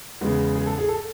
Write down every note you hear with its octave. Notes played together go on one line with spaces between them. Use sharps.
E2 C#3 G#3 B3
G#4
A4
G#4
A4